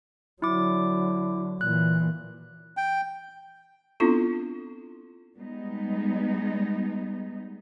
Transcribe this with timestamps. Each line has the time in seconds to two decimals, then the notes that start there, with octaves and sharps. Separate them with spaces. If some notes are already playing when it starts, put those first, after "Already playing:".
0.42 D3 F#3 E4 D6
1.61 A#2 E3 F#6
2.77 G5
4.00 B3 C4 D4 E4 F4 A4
5.37 G3 G#3 B3 D#4